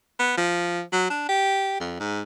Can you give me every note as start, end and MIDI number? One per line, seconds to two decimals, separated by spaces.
0.19 0.34 59
0.37 0.82 53
0.93 1.09 54
1.10 1.27 62
1.29 1.77 67
1.80 1.99 41
2.00 2.21 44